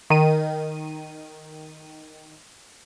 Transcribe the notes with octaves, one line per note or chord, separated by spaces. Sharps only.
D#3 D#7